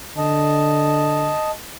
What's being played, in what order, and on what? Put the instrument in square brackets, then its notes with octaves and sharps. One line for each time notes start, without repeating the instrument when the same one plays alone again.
[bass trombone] D3 [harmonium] D#5 A5